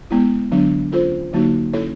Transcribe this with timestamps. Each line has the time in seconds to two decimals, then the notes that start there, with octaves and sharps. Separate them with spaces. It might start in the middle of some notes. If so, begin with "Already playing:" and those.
0.11 G#3 B3 E4
0.52 D3 F#3 B3 D4
0.92 C#4 F4 A4 C5
1.33 D3 F#3 A#3 D#4 F#4
1.73 C#4 E4 A4 C#5